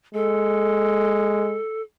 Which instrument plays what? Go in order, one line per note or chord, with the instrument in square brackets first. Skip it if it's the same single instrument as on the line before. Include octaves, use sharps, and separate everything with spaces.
[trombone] G#3 [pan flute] A4